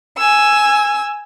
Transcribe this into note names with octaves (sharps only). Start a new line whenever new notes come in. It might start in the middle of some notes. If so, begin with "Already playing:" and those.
G#5 E6